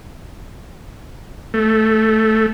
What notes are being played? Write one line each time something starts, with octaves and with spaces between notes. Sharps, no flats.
A3